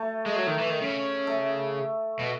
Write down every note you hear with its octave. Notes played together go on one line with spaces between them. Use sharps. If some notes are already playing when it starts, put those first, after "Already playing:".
Already playing: A3
G#3
F#3
D#3
E3
D#3
C#3
A3
B2